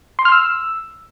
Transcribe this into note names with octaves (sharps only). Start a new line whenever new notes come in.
C6
F6
E6